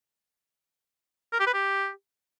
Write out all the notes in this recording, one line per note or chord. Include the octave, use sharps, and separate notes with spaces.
A#4
G4
B4
G4